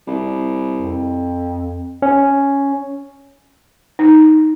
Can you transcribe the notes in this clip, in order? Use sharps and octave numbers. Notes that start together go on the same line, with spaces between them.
C2
F2
C#4
D#4